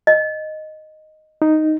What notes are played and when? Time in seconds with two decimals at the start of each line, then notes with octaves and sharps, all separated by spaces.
0.07 D#5
1.42 D#4